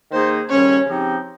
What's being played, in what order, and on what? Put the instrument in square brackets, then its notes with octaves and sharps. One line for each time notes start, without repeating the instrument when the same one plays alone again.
[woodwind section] D#3 A#3 D#4 G#4 [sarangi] C5
[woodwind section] D#2 C#3 G3 C#4 [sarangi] C#5
[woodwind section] C#3 F3 C4 D#4 G4